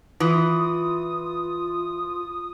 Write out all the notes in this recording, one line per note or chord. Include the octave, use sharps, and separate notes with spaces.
E3 F4 D#6